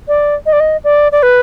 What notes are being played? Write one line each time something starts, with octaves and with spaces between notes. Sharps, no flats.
D5
D#5
D5
D#5
D5
D5
B4